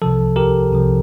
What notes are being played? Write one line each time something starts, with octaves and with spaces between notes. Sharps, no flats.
C2 C3 F3 A4
G4 A#4
C2 C3 F3